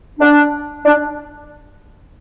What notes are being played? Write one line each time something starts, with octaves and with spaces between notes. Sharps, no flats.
D4
D4